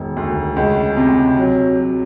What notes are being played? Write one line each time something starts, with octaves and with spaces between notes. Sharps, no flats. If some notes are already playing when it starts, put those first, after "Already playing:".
Already playing: E1 D#3
D2
C#2
C3
F#3
F#3